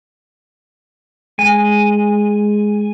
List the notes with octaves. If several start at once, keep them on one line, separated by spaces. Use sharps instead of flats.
G#3 G#5